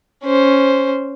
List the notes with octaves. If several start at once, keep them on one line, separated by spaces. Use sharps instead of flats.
C#4 C5